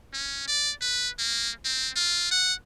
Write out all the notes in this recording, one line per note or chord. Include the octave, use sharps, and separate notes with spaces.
C#4
D5
B4
A#3
C4
F4
F#5